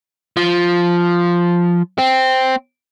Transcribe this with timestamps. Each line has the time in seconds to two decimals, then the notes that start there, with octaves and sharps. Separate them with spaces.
0.37 F3
1.98 C4